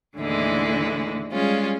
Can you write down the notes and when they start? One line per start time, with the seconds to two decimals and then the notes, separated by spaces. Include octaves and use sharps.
0.16 D#2 A2 D3 E3 G#3 E4
1.31 G3 G#3 C#4 F4